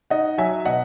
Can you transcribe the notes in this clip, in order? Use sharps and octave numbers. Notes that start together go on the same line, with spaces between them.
D#4 D#5 F#5
F#3 E5 G#5
B2 D#5 F#5